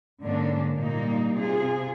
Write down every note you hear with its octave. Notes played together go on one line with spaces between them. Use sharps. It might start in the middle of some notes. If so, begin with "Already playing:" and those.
G#2 D3 A#3 C#4 D4
A#2 G3 A#3 D#4
C3 F4 G#4